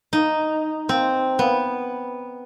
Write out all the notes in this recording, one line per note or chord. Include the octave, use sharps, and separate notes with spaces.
D#4
C4
B3